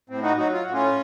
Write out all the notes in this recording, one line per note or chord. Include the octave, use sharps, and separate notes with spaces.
A2 C4
D#4 F#4
F#3 D#4 F#4
F4
A2 F#4
C#4 F4